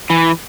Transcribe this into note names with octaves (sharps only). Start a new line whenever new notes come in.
E3